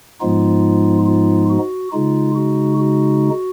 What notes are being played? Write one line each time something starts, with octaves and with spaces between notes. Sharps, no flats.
G#2 F3 G#3 B3 D#4 F4
F4
F#4
C#3 G#3 D#4 F4
F#4
F#4